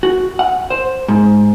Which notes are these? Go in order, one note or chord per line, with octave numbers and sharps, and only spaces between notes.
F#4
F#5
C5
G#2